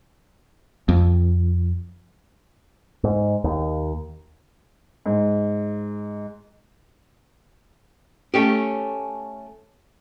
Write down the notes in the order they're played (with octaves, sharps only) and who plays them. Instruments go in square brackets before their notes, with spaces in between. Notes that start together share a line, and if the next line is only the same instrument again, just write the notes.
[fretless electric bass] F2
[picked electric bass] G#2
D#2
[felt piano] G#2
[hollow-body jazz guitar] A3 C#4 G4